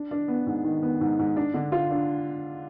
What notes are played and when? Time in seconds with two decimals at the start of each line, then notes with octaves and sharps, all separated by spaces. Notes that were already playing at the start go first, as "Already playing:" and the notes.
Already playing: D4
0.11 D4
0.28 B3
0.47 G#2
0.64 D#3
0.83 B3
1.01 G#2
1.19 G#2
1.36 D4
1.54 D3
1.72 F4
1.90 D4